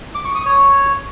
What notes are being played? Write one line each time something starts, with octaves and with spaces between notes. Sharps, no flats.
D6
C#6
D#6
C#5